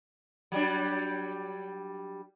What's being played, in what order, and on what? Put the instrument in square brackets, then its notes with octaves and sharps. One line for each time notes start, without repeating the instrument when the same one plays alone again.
[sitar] F#3 G3 D4